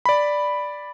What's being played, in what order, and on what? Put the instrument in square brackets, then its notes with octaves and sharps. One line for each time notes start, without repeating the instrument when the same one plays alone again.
[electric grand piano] D5 B5